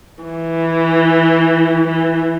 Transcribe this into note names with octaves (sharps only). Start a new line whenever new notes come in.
E3
E3